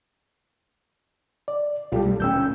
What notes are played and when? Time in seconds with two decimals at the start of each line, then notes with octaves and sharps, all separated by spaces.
1.48 D5
1.92 B1 G3 F4 G4 A4
2.05 A3
2.20 D1 C#4 G5 E6 G6